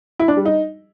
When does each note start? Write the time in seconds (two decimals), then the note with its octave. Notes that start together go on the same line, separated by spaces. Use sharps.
0.19 E4
0.28 D4
0.37 G3
0.45 D#4